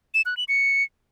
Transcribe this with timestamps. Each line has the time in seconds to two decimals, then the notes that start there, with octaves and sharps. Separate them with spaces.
0.14 E7
0.26 F#6
0.37 F#7
0.48 C#7